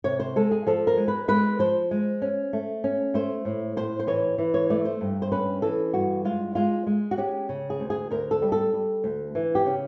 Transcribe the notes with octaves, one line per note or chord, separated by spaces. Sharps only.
C3 C#5
C5
G#3 A4
G#4
F3 A4
A#4
G#3
B4
G#3 B4
F3 C5
G#3
C#4
A3
C#4
A3 C5
A2
A2 C5
C5
E3 C#5
E3
C#5
A3 D5
C5
G2
C5
C#4 B4
E3 A4
G2 F#4
G#3 F4
G#3 F4
G#3
F#4
C#4 G4
C#3
G#4
D2
G#4
D2 A#4
A4
G3
A4
G3
D2
E3
G4
C#3